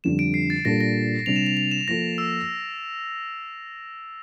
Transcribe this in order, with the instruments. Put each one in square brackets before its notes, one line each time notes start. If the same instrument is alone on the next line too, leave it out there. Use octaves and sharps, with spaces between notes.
[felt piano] F2 D3 G3 [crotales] E7
[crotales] D7
C7
A6
[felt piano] A#2 G3 D4 A4 [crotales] A#6
[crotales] A#6
[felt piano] C3 G3 D4 [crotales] F7
[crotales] E7
F7
F7
E7
[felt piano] F3 A#3 F4 A4 [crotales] A#6
[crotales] E6